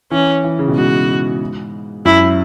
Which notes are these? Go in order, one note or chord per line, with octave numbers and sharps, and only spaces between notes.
E3 C#4
E3
C#3
B2
G#2 F#4
F#2 E4